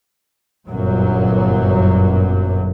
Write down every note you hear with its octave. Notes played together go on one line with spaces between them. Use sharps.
G1 F#2 A#2 F#3